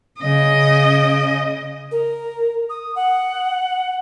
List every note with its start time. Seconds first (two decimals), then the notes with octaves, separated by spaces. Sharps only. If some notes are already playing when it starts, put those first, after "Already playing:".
0.20 C#3 D#5
1.91 A#4
2.70 D#6
2.96 F#5